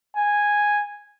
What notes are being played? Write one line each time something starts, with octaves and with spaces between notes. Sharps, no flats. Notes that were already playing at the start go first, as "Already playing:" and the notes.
G#5